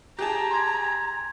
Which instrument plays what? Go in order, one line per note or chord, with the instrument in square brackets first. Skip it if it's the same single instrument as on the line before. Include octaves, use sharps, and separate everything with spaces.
[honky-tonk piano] G4 G#4 A5 [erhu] A#5
[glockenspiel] C6 G#6